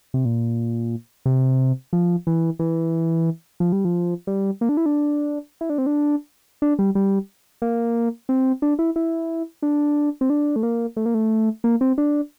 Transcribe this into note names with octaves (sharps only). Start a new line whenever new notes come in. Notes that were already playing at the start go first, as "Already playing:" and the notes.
C3
A#2
C3
F3
E3
E3
F3
G3
F3
G3
A#3
D4
E4
D4
E4
D4
C4
D4
D4
G3
G3
A#3
C4
D4
E4
E4
D4
C4
D4
A3
A#3
A3
A#3
A3
A#3
C4
D4